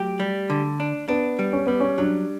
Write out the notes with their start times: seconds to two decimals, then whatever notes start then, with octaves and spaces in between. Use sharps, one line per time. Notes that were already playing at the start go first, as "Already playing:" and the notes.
Already playing: F#3 A3 G4
0.20 G3
0.50 D3
0.80 D4
1.08 B3 D4
1.39 G3
1.53 C#4
1.67 G3 B3
1.80 C#4
1.98 F#3 D4